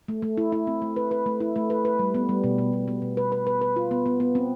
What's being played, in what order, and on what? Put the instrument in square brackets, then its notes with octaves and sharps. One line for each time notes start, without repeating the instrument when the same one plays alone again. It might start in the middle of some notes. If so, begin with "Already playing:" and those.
[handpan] A3
A3
E4
E4
C4
A3
B4
B4
A3
E4
A3
B4
B4
G3
B3
G3
B2
B2
B2
B3
B2
B4
B4
B4
B4
F4
B3
B3
B3
C4